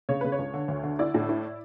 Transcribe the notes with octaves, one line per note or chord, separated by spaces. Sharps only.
C#3 C#5
C#3 B4
C#5
C#2
D3
D2
D3
E4 D5
A2
E4